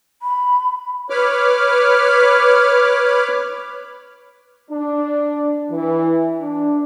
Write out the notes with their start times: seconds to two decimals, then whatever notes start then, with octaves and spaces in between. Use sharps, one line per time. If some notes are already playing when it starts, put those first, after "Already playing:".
0.22 B5
1.10 B4 C#5 B5 D6 F6
4.71 D4
5.70 E3
6.41 D4